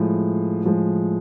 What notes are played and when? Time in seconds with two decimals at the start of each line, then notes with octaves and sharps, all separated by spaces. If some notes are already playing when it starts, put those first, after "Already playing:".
Already playing: A2 F3 G#3
0.63 A2 F3 G#3